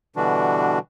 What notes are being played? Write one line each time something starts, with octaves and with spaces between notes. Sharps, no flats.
B2 D3 E3 G3 D4 F#4